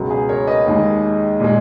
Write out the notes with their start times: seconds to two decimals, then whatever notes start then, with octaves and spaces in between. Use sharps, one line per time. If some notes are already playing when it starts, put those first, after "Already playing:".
Already playing: C#2 B2 F#3
0.10 G#4 B4
0.29 A#4 C#5
0.47 B4 D#5
0.67 D#2 D#3 G#3
1.40 A#2 G#3